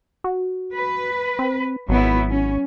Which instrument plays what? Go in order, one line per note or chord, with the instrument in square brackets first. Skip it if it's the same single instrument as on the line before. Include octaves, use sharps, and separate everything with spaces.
[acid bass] F#4
[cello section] B4
[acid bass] C4
[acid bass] G#1 [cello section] F#3 B3 E4
[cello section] C#4